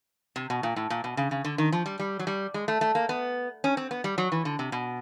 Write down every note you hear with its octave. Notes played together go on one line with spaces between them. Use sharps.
C3
B2
A#2
A2
A#2
B2
C#3
C#3
D3
D#3
F3
G3
G3
F#3
G3
G#3
A3
A3
A#3
B3
C#4
C4
B3
G3
F#3
E3
D3
C3
B2